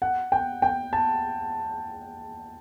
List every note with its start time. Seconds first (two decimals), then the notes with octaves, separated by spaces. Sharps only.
0.02 F#5
0.32 G5
0.62 G5
0.93 A5